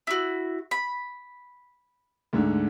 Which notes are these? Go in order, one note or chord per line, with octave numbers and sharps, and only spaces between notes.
E4 F#4
B5
D2 G#2 D3